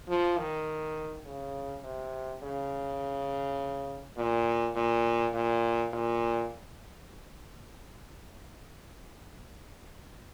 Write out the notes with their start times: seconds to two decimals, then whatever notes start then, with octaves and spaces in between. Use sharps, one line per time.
0.08 F3
0.38 D#3
1.26 C#3
1.84 C3
2.43 C#3
4.17 A#2
4.76 A#2
5.34 A#2
5.93 A#2